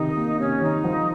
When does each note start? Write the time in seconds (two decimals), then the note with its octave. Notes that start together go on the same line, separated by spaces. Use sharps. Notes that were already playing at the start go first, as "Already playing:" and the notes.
Already playing: C3 D#3 D#4
0.16 A#3
0.39 C3 C#4
0.61 D#3 D#4
0.84 F3